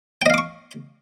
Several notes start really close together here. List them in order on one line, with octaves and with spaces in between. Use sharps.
G5 D#5 F5 D6 C#6